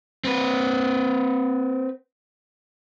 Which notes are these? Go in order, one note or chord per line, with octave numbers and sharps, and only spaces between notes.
C4 B4